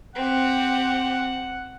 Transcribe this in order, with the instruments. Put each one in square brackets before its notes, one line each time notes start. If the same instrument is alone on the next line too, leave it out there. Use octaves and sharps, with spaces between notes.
[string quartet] C4 G4 [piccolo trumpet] F#5